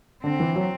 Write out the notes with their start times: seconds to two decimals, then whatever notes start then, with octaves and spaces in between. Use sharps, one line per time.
0.23 D3 C4
0.40 E3
0.55 F#3